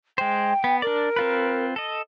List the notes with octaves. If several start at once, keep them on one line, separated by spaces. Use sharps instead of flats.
G#3 C5 G5
B3
D4 A#4 D5
C4 F4 B4
A4 D#5